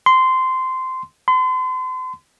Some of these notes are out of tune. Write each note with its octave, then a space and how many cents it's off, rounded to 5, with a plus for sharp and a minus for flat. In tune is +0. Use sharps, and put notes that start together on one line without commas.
C6 -15
C6 -40